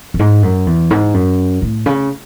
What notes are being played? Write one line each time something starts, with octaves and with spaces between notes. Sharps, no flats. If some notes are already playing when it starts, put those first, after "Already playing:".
F#2
G#2
F#2
E2
G#2
F#2
A2
C#3